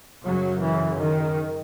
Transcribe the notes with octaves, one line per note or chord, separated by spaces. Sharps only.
F#2 C#3 F#3
E3
D#3